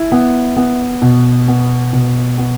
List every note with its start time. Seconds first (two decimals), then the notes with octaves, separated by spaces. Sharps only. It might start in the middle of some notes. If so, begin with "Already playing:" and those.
Already playing: E4
0.12 B3
0.57 B3
1.02 B2
1.48 B3
1.93 B2
2.38 B3